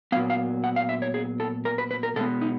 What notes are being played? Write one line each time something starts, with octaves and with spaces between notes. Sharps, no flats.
A#2 F#3 B3 F5
F5
F#5
F5
E5
C#5
G#4
A4
A#4
B4
B4
A#4
B2 G#3 B3 A4
D#4